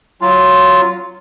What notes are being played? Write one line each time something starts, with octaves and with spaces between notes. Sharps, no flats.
F#3 F4